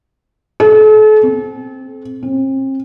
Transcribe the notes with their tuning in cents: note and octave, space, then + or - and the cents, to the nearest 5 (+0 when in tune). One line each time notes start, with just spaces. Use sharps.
A4 -40
C4 +5
C4 +40